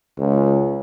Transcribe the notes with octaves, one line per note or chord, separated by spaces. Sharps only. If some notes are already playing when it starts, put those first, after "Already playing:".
C#2